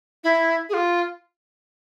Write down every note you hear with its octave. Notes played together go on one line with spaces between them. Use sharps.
E4
G#4
F4